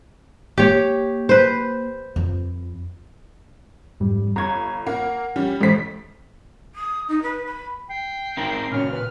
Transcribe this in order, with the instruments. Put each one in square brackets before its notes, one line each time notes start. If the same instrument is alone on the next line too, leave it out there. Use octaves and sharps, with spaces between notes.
[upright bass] A#3 [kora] G4 C#5
[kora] B4 C5
[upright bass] F2
[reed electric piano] F2 G#2 G3
[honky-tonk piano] G1 G#6 [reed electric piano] A#5 C#6
[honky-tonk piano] A#3 [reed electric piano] F#5
[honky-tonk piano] G3 C#4
[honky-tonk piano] A1 B6 [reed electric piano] G#3 A4 C5
[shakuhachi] D#6
D#4
B4
B5
[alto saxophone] G5 [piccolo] C7
[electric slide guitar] C4 D#4 A#4
[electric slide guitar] A#2 C#3 [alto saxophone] C#4 [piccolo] F6
[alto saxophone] B4